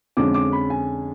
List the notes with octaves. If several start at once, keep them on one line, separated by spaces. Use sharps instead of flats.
F2 D3 G#3 C#4 D6
D6
B5
G#5